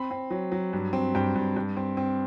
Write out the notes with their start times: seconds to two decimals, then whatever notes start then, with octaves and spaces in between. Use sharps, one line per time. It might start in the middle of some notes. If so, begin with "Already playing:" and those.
Already playing: C4 B5
0.11 C4
0.31 F#3
0.52 F#3
0.73 G2
0.93 C4
1.15 G2 G5
1.36 G2
1.56 G2
1.77 C4
1.97 C4